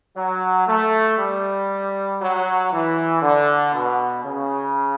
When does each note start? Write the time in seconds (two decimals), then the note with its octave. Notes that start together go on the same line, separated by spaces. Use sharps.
0.16 F#3
0.67 A3
1.18 G3
2.20 F#3
2.71 E3
3.22 D3
3.73 B2
4.24 C#3